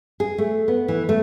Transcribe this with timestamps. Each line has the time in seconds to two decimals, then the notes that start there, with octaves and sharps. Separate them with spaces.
0.20 G#4
0.38 A3
0.68 B3
0.88 E3
1.09 A3